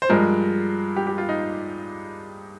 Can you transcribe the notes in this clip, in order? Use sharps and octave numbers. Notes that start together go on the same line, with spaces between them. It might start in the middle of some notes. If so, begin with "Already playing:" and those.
C5
G2 F3 G#3 A#4
G4
G4
F4
D#4